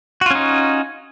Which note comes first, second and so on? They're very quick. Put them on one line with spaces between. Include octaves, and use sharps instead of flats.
F#4 F4 C#4 D#4